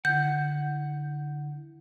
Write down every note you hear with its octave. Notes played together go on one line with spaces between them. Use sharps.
D3 E4 F#5 G6